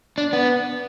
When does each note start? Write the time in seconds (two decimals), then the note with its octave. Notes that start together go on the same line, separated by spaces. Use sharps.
0.18 D4
0.33 B3